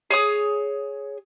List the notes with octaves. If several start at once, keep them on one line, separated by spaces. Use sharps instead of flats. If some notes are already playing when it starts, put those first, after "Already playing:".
G#4 C#5 D#6